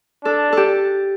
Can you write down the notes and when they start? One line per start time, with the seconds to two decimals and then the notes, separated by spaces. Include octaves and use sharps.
0.25 D4 A4
0.52 G4 A4